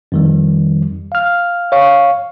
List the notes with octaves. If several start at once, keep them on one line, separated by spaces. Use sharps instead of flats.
F2 D#3 G3
F5 F6
C#5 F5 C#6